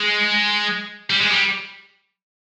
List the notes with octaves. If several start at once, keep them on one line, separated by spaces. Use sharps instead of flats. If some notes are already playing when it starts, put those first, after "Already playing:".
Already playing: G#3
G3
G#3
G3